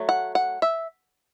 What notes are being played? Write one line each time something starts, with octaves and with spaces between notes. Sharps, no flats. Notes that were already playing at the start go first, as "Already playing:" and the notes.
Already playing: F#3 A3
F#5
F#5
E5